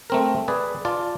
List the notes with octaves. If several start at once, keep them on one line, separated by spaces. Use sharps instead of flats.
A3 C4 A#4
G#4 B4 D5
F4 D5 A5